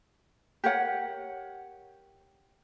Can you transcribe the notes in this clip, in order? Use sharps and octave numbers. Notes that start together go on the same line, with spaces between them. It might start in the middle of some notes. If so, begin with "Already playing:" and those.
G4 A#4 C#5 F#5